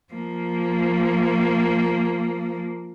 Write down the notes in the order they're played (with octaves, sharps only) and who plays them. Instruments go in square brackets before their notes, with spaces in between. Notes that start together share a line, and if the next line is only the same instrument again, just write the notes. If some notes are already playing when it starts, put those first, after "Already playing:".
[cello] F3 A#3